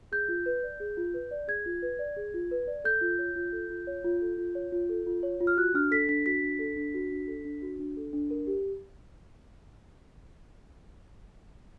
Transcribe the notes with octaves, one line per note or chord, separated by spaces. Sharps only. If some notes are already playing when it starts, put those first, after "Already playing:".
G#4 G6
F4
B4
D5
G#4
F4
B4
D5
G#4 G#6
F4
B4
D5
G#4
F4
B4
D5
A4 G6
F4
C#5
F4
A4
F4
C#5
F4
A4
F4
C#5
F4
A4
F4
C#5
F4
F6
F#4 F#6
D4 F6
A4 B6
D4 B6
F#4 B6
D4
A4
D4
F#4
D4
A4
D4
F#4
D4
A4
D4
A#4
G4